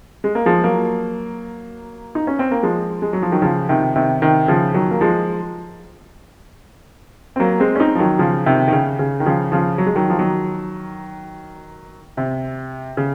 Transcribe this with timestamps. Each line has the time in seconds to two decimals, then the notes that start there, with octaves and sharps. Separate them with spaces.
0.24 G#3
0.35 A#3
0.46 F3 G#3
0.64 F#3 A#3
2.15 D#4
2.27 C#4
2.39 C4
2.51 A#3
2.63 F3 G#3
3.02 G#3
3.13 F#3
3.22 F3
3.32 D#3 F#3
3.42 C#3 F3
3.69 C3 D#3
3.96 C3 D#3
4.22 C3 D#3
4.48 C#3 F3
4.74 D#3 F#3
4.91 A#3
5.01 F3 G#3
7.36 C4
7.40 F#3 A#3
7.60 G#3 C4
7.75 C#4
7.80 C4 D#4
7.95 F3
7.99 D#3 F#3
8.19 C#3 F3
8.46 C3 D#3
8.68 D#3
8.73 C#3
8.99 C#3
9.20 D#3
9.26 C#3 F3
9.52 C#3 F3
9.78 F#3
9.86 G#3
9.96 D#3 F#3
10.10 F3
10.19 D#3 F#3
12.17 C3
12.97 C#3